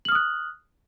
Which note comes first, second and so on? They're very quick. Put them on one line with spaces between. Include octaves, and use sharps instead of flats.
F#7 F6 D#6 F#6